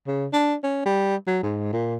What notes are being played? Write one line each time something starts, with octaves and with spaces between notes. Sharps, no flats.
C#3
D4
C#4
G3
F#3
G#2
A#2